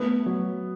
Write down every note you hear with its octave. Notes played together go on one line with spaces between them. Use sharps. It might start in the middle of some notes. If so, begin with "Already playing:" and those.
Already playing: A3 B3
F#3